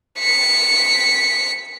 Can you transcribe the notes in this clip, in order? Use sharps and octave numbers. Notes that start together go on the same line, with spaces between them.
B6 C#7